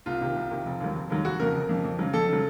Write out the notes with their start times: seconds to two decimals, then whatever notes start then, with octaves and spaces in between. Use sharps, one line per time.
0.06 C2 F4
0.21 C3 D#3
0.36 C2
0.51 C3 D#3
0.66 F1
0.80 D#2 D#3 F#3
0.95 F1
1.10 D#2 D#3 F#3
1.25 F1 F#4
1.39 F2 C#3 A#4
1.54 F1
1.69 F2 C#3
1.84 F2
1.99 C#3 F#3
2.13 F2 A4
2.28 C#3 F#3